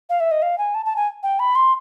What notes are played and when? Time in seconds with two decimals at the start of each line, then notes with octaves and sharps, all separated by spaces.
0.10 F5
0.20 E5
0.31 D#5
0.42 F5
0.58 G#5
0.74 A5
0.86 A5
0.96 G#5
1.23 G5
1.39 B5
1.55 C6